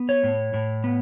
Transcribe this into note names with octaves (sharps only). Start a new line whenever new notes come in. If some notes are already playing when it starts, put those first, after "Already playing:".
Already playing: B3
C#5
A2
A2
B3